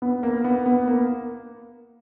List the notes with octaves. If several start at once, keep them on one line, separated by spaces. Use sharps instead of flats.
B3
A#3
B3
B3
A#3